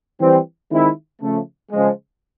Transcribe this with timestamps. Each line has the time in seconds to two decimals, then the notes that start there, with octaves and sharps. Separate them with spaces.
0.19 E3 G3 C4
0.70 D#3 G#3 C4 E4
1.21 C#3 F3 A3
1.71 C#3 F3 G#3